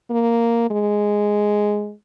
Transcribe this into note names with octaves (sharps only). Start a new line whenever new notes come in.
A#3
G#3